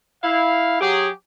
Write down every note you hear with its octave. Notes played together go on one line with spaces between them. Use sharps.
E4 F5
F#3 G4 G#4